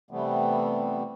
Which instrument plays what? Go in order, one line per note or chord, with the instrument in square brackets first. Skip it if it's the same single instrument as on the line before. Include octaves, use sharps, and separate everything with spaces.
[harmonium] C3 E3 G3 A3 B3 C4